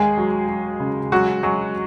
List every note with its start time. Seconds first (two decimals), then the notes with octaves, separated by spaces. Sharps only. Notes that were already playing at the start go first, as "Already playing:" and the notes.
Already playing: D#2 G#3 G#4
0.17 F#3
0.48 F#3
0.80 C#3
1.12 F#3 G#3 F#4
1.43 F#3 G#3 F#4